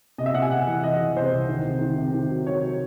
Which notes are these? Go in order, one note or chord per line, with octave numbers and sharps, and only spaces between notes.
C3 D#5
E5
C3 F#5
G#5
C3 F#5
E3
E3 D#5
E3
C3 C5
C2
D#3
C3
D#3
C3
D#3
F#3
F#3 C#5